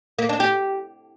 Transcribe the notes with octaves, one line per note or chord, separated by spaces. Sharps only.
A#3
D4
G4